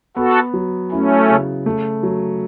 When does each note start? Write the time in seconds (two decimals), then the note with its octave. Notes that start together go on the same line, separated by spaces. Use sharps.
0.16 B3 F#4 A4
0.54 F#3
0.92 A3 C#4 E4
1.29 C#3
1.66 A3
2.03 F#3